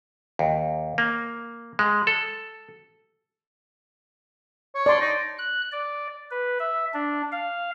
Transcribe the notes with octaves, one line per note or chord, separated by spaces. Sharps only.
D#2
A#3
G#3
A4
C#5
D5 C6
D#4
F#6
D5
B4
E5
D4
F5